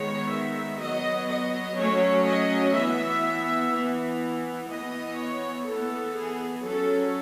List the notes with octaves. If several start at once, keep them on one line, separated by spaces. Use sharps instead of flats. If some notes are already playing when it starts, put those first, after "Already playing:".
Already playing: D#3 G#3 B3 C#5
E5
F#3 B3 D#5
D#5
F#3 A3 C#4 C#5
D#5
E3 B3 E5
E3 B3
E3 B3 D#5
C#5
E3 B3 A4
G#4
F#3 C#4 A4